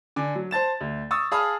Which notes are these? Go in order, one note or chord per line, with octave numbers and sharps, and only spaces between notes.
D3 G#5 D6
F#3
C5 A5 A6 E7
D2
C#6 D#6 E6 A6
G#4 F5 A5 B5 D#6 F6